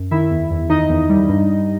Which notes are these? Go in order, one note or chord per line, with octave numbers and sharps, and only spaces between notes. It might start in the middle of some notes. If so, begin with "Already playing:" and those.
Already playing: F#2
D#3 E4 E5
E2
E2
D#3 D#4 D#5
E2
G3
G2
G2